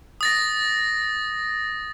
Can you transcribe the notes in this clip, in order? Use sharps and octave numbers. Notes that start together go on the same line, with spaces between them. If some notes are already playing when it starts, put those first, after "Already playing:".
D#6 A6 A#6